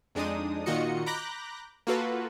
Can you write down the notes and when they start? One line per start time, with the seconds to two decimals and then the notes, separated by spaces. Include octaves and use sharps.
0.15 F2 G#3 D4 D#4 D#6
0.66 A#2 D#3 F4 F#4 D#5 C#7
1.06 A#5 B5 D6 F#6 G6 A#6
1.87 A#3 F4 F#4 A4 B4